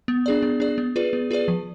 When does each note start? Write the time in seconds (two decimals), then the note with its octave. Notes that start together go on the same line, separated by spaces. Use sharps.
0.08 B3
0.26 D4 G#4 D5
0.42 B3
0.60 D4 G#4 D5
0.78 B3
0.96 F4 G#4 B4 D5
1.13 B3
1.31 F4 G#4 B4 D5
1.48 F3